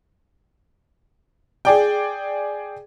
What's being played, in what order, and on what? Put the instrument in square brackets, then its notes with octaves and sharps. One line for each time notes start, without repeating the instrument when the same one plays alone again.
[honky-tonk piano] G#4 D5 G5